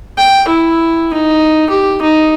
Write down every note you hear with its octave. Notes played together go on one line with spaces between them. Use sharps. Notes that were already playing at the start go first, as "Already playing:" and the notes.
G5
E4
D#4
G4
D#4